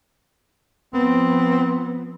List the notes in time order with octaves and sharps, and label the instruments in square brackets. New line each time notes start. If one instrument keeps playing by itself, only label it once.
[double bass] F3 B3 [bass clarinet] C4